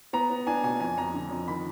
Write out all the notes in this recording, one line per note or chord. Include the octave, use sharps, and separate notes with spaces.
B3 A#5
B3
D4 G#5
B2 G#5
F2 G#5
F2 A#5
D3
F2
D#3 B5